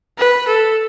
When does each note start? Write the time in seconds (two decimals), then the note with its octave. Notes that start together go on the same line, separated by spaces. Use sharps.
0.19 B4
0.48 A4